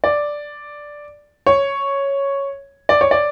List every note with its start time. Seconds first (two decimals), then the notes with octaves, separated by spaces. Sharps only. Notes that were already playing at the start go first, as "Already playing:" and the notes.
0.04 D5
1.47 C#5
2.89 D5
3.01 C#5
3.11 D5